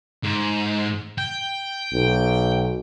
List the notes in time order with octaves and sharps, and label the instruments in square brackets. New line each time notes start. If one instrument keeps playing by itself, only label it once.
[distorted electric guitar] G#2
G5
[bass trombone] B1